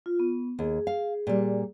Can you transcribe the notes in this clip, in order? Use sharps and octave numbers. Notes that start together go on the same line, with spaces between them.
F4
B3
D#2 G#4
F5
A#2 G3